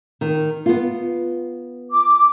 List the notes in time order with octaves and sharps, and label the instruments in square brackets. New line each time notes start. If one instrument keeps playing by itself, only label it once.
[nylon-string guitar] D#3
B3 F4
[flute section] D6